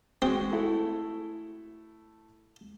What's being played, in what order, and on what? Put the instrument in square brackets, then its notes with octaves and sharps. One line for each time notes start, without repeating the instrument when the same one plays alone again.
[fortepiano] G#3 F#4 [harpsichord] C4
[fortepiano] A3 E4 A4